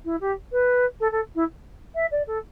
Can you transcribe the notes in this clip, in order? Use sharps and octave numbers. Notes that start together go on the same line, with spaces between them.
E4
G4
B4
A4
A4
E4
E5
D5
A4